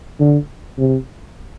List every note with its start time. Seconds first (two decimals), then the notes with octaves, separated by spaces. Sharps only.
0.20 D3
0.79 C3